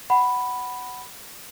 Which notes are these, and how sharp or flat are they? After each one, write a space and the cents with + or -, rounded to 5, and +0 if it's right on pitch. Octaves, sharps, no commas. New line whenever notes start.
F#5 +15 B5 +0